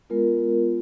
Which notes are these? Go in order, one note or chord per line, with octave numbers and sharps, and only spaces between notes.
G#3 B3 F4 A#4